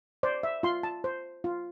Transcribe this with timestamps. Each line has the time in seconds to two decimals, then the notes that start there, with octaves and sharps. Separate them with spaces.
0.23 C5 D5
0.43 E5
0.63 F4 C6
0.83 A5
1.04 C5
1.44 F4